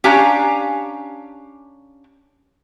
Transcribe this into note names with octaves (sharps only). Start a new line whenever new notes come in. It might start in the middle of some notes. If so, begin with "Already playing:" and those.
C#4 D4 G4 F5 G#5 A#5